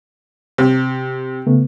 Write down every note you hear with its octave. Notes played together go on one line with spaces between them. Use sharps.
C3
C#3 A3 B3